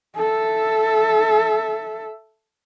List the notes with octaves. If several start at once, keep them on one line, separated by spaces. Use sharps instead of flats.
A4 E5